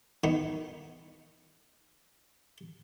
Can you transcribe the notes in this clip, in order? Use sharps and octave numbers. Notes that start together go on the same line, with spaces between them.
D#3 B3 D#4